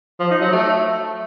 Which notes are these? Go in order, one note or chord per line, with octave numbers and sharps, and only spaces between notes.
F3
D#4
F#3
A3